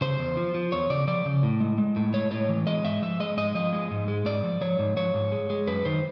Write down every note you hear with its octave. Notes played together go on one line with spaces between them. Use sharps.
C#3 C5
E2
F3
F3
E2 C#5
C#3 D5
F3 D5
C#3
A2
G#3
G#3
A2
G#3 C#5
A2 C#5
E3
G#3 D#5
G#2 E5
F3 E5
G#3 D#5
G#2 D#5
F3 D#5
G#3
G#2
G#3
G#2 D5
F3
F3 C#5
G#2
F3 C#5
G#2
G#3
G#3
F#2 B4
D#3 C5